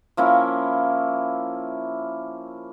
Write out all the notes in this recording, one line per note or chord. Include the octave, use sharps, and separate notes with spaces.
F3 A#3 C#4 E4